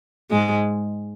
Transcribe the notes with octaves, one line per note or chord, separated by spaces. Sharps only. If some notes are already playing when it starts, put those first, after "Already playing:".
G#2 G#3